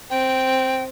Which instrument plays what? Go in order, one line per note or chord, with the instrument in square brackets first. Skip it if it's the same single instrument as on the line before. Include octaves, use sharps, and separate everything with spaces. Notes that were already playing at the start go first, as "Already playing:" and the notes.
[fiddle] C4 [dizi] G5